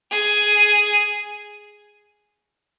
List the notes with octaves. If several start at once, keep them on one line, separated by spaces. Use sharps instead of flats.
G#4